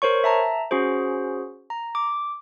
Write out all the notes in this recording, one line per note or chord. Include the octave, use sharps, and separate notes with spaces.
A#4 C5 C#5 C#6
E5 A5 A#5
C#4 F#4 G#4 C5
A#5
D6